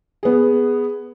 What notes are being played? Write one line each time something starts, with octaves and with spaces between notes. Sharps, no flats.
B3 G#4